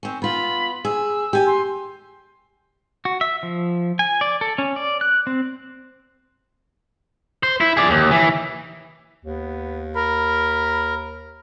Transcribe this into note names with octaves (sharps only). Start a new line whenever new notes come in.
C4 C#4
B3 F4 B5
G#4 E6
G4 G#5
C6
F#4
E5
F3
G#5
D5
A4
C#4
D5
F#6
C4
C5
E4
G#4 D5
D#2
E3
D#2 B3
A#4 B5